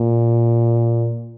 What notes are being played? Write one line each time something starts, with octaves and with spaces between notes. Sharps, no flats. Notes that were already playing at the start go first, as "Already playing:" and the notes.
Already playing: A#2